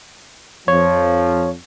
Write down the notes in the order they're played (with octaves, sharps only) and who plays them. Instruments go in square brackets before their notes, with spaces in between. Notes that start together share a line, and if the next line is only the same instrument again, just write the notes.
[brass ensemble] F2 F3 [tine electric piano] C#5